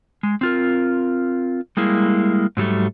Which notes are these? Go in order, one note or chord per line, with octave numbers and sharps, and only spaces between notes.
G#3
C4 F4 A#4
G3 G#3 A#3 E4
G#2 F#3 G3 A3